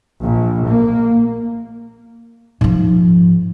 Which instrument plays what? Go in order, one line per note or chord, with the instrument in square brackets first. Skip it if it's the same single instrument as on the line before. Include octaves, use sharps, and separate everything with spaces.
[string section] A#1
A#3
[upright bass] G#2 F3